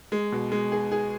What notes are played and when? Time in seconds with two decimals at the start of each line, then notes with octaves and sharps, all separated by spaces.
0.12 G#3
0.32 B2
0.52 G#3
0.72 G#4
0.92 G#4